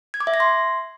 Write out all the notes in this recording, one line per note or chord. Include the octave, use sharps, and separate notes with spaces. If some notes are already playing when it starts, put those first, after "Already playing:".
G#6
D6
E5
A#6
C6